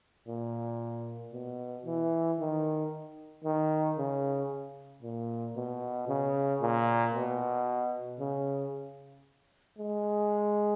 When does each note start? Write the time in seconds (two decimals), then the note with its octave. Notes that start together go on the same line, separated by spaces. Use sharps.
0.28 A#2
1.33 B2
1.85 E3
2.39 D#3
3.44 D#3
3.98 C#3
5.02 A#2
5.56 B2
6.08 C#3
6.61 A#2
7.14 B2
8.19 C#3
9.78 G#3